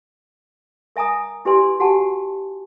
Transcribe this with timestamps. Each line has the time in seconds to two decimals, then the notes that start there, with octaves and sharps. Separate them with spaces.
0.96 A#4 E5 G#5 A#5 D#6
1.45 E4 G4 B4 D5 G#5 C6
1.80 F#4 G4 F#5 G#5 A5